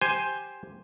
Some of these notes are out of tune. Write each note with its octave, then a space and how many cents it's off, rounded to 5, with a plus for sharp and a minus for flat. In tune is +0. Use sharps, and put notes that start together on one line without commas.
G4 +0 C5 +0 G#5 +5